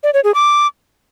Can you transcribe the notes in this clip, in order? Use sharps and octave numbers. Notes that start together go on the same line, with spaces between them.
D5
C#5
G#4
D6